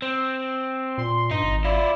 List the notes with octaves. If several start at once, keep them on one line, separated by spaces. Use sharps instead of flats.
C4
A#2 C6
G2 D#4
G#1
E4 F4 D5